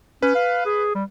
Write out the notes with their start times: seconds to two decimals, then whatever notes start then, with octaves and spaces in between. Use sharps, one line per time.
0.22 C#4 B4
0.36 F5
0.66 G#4
0.95 G3